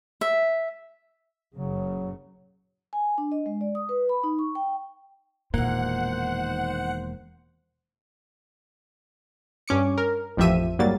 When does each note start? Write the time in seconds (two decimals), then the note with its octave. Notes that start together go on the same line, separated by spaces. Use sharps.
0.21 E5
1.55 F#1 C#3 F#3
2.93 G#5
3.18 D4
3.32 D#5
3.46 G#3
3.61 D5
3.75 D#6
3.89 B4
4.09 B5
4.24 D#4
4.39 C#6
4.55 G5
5.54 E1 A#2 D#3 A#3 C5 F#5
9.68 G2 C#4 D6 C#7
9.98 A#4
10.37 A1 F2 F3 G4 E5 D#7
10.79 G#2 F#3 G3 A#3 A6